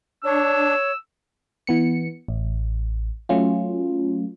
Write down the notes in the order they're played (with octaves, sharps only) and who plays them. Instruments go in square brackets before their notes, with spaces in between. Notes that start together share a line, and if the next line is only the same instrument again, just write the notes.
[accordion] D4 [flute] C#5 [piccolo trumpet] E6
[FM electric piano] E3 B3 C#7
A1
F#3 A3 C#4 F4